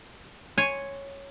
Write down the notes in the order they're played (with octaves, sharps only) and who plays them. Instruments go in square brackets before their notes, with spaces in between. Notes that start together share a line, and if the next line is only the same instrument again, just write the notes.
[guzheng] C#5 G#5 C6